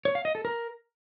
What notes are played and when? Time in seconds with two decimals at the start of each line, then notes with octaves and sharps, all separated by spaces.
0.05 C#5
0.15 F5
0.25 D#5
0.35 A4
0.45 A#4